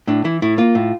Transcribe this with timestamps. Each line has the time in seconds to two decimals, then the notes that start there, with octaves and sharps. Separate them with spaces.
0.07 A2 D4
0.24 E3 E4
0.42 A2 E4
0.58 A#3 F4
0.75 A2